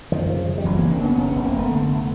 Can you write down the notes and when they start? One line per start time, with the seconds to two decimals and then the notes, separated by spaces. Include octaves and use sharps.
0.12 F#2 D#3 F3
0.30 C#3
0.48 C#3
0.58 G3
0.65 F#1 E3 F#3
0.78 A#3 C4
0.83 C#3
0.91 C4 D4
1.00 C#3 B3 C#4
1.18 F1 B3 C#4
1.31 F1 B3 C#4
1.45 A#3 C4
1.54 F1 A3 B3
1.71 D3
1.88 F1